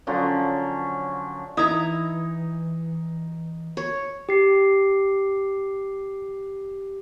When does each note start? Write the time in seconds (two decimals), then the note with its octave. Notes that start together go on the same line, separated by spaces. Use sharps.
0.07 D3 F3 F#3 C#4
1.57 E3 D#4 E4 A#5 D#6 G#6
3.77 C#5
4.29 G4 C7